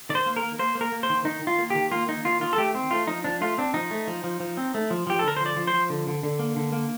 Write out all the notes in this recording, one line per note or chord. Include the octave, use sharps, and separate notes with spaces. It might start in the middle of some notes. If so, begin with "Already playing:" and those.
D#3 D5
C5
A#3
A#4
A#3
A#3 C5
A#3
A#4
A#3
C5
D#3
D#3 D#4
D#3
F4
A#3
G4
D#3
A#3 F4
A#3 D#4
D#3 F4
D#3 F4
A4
A3 G4
C4
A3 F4
F3 D#4
F3 D4
A3 F4
C4 D4
F3 D#4
A3
F3
F3
F3
C4
A3
F3
F3 G4
A4
D3 A#4
C5
F3 D5
F3
C5
F3
D3
D3
D3
A#3
D3
A#3